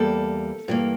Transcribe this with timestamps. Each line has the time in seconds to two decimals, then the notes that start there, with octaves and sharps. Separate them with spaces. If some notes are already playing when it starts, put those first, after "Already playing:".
Already playing: E2 G3 A#3 A4
0.68 G2 E3 A#3